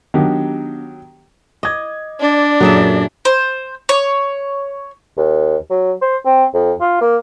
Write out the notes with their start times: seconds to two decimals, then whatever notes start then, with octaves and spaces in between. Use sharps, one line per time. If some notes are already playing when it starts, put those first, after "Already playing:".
0.14 D#3 F#3 B3 D4 G4
1.63 D#5 D6 G#6
2.20 D4 D5
2.60 F#2 A#2 F#3 G#4 A4 E5
3.25 C5
3.89 C#5
5.17 D#2
5.70 F#3
6.01 C5
6.25 C4
6.54 F2
6.81 F4
7.01 A#3